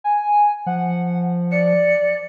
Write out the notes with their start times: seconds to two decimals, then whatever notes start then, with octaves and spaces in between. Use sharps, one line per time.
0.04 G#5
0.66 F3 F#5
1.52 D5 C#7